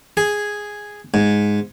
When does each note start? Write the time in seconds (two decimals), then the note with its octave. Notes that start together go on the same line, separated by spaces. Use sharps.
0.17 G#4
1.14 G#2